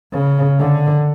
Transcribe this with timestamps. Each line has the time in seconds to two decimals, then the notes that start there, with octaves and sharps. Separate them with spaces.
0.13 C#3
0.60 D3